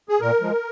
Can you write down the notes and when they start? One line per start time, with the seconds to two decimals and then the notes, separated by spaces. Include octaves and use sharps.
0.09 G#4
0.21 A#2 A#4
0.41 F3 G#3